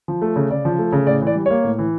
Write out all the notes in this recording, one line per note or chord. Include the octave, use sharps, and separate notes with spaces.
F3
A3
C#3
C#3 D5
F3
A3
C#3
A2 D5
E3 D5
G3
A#3 C#5
A2
E3